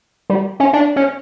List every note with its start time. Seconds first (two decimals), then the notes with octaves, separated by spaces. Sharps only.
0.30 G3
0.60 C#4
0.73 D4
0.96 C#4